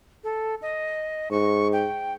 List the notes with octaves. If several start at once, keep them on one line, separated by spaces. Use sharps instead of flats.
A4
D#5
G#2 C#6
G5